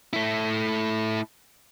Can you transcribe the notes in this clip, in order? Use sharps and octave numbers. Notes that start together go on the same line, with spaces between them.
A3 E4